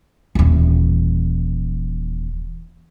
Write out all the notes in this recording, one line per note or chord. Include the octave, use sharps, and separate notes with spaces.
D#1 E3